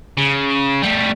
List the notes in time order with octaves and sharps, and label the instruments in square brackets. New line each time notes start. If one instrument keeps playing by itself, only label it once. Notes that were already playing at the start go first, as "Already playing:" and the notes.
[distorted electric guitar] C#3
G3 A3